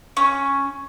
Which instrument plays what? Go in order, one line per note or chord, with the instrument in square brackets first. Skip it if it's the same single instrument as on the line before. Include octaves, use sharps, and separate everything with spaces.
[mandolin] C#4